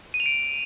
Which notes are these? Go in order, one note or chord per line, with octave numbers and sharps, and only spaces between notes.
D#7
F7
D7